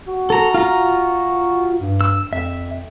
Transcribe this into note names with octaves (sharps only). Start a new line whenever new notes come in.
F#4
A4 A#5
F4 A#5
G2
E6
F2 E5